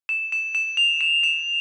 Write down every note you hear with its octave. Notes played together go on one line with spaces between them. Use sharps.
E7
E7
E7
F7
E7
E7